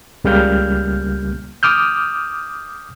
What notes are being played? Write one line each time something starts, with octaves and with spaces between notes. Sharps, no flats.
C#2 C#3 G3 A#3 F6 G6
D6 D#6 F6 G6